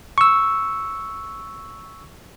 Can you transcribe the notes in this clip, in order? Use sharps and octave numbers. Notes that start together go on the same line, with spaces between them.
C#6 E6